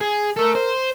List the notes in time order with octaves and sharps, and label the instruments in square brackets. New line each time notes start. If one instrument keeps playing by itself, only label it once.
[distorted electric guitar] G#4
[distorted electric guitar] A4 E5 [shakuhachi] A#4
[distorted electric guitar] C5